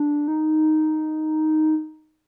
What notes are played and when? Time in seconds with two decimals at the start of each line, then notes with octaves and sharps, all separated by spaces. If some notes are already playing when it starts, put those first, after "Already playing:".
Already playing: D4
0.28 D#4